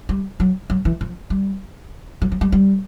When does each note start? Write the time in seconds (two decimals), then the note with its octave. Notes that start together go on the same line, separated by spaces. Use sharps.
0.09 G3
0.40 F#3
0.70 F#3
0.85 E3
1.01 F3
1.30 G3
2.22 F#3
2.32 F#3
2.41 G3
2.52 G3